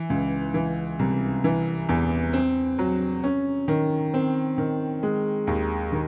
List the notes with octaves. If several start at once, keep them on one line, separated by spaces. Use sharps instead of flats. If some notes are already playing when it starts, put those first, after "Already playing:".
Already playing: E3
C#2
E3
C2
E3
E2
C4
F#3
C#4
D#3
C4
D#3
G#3
D#2
D#3